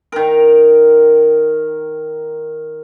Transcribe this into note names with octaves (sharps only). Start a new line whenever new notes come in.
D#3 A#4